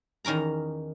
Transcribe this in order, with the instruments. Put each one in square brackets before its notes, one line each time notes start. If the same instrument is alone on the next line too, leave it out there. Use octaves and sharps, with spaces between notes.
[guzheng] E2 D#3 C#4 A#4 A#5